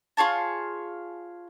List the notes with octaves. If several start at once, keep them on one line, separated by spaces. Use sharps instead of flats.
F4 G#4 C#5 A5